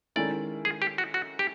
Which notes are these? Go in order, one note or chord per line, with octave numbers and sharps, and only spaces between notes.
D#3 G#3 C#4 E4 A4 D5
G#4
G4
F#4
F#4
G4